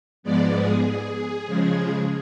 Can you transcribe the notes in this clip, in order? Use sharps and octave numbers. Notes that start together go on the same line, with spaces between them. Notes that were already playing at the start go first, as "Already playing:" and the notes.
G#2 F3 G#3 B3 D5
G#4
C#3 F3 G#3